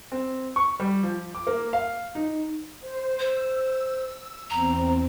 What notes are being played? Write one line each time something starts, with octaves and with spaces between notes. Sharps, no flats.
C4
C#6
G3
F3
D6
A#3
F5
D#4
C5
C5 E6
E2 C4 A#5